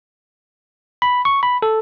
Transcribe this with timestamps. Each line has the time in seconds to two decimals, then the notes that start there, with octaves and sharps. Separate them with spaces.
1.02 B5
1.25 C#6
1.43 B5
1.62 A4